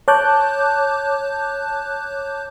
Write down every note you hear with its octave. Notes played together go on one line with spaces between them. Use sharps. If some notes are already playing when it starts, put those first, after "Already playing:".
C#5 A5 D6 F#6 G6